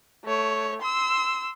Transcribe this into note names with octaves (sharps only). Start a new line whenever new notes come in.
A3 C#5
C6 E6